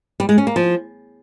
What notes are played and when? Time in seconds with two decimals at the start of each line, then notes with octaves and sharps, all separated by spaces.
0.20 G3
0.29 G#3
0.38 C#4
0.47 A#3
0.56 F3